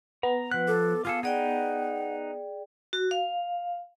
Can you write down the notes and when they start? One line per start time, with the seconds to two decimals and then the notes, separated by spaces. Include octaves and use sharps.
0.23 B3 A#5
0.51 F3 B4 F#5 F#6
0.68 A4 D6
1.05 F4 G#4 A4 F5
1.23 D#4 G#4 B4 D5 F#5 G5
2.93 F#4
3.11 F5